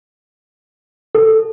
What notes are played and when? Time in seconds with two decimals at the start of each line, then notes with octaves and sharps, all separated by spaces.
1.15 A4